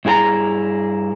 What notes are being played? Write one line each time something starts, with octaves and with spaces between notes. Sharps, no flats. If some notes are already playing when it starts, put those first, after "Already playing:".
G2 E4 G#4 G#5 A#5